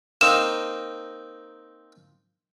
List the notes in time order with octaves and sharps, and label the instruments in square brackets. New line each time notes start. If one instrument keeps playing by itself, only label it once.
[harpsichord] A#3 C4 D#4 [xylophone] E7